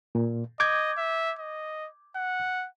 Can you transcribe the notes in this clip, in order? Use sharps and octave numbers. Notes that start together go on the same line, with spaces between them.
A#2
D#5 D6 G6 G#6
E5
D#5
F#5